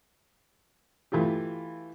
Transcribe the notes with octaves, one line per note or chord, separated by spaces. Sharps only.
E3 A3 F4 G4